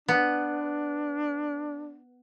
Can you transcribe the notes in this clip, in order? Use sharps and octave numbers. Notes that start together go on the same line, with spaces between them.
B3 D4